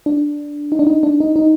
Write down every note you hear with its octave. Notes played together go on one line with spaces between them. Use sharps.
D4
D#4
D4
D#4
D4
D#4
D#4